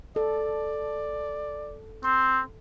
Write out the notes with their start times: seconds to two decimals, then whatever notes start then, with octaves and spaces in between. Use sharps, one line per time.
0.16 A4 D5
2.04 C4 C6